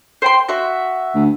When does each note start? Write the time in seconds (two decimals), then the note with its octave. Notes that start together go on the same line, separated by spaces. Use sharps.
0.22 C5 G5 C6
0.49 F#4 E5
1.14 D2